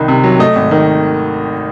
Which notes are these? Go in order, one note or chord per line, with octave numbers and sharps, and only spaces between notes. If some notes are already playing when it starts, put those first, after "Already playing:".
Already playing: C2 D#3
C3
F#3
A3 D#5
G#1
D#3